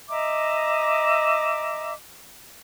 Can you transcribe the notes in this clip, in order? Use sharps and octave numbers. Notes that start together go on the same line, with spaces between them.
D#5 E5 A#5 D6